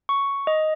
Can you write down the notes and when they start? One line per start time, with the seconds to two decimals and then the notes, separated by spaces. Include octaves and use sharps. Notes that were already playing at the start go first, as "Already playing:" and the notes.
0.09 C#6
0.47 D#5